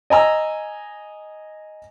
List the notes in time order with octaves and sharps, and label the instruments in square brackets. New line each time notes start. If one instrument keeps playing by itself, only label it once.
[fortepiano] D#5 G#5 A#5 E6